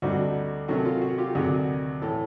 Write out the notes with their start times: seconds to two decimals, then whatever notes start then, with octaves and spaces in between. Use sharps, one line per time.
0.02 D2 D3 G3 C4 D#4 F#4
0.68 C3 D#3 F#3 A3 C#4 F#4
0.85 F4
1.02 F#4
1.18 F4 G4
1.35 D2 C3 D#3 F#3 F#4 G#4
2.01 A2 E3 A3